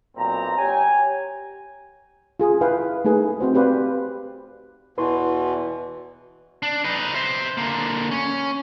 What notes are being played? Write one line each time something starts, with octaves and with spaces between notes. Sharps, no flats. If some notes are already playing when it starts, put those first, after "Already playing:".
B1 A#2 C4 A#5
G4 C#5 G5 G#5
F4 G#4
E4 B4 F5 G5
A3 A#3 D#4 G#4 B4
A3 C4 F#4 C5
C4 G4 B4 C5 D5 F5
E2 B2 E3 E4 F#4 B4 C6 C#6
D4
D#4 B4
C5 E5
D3 A#3
C#4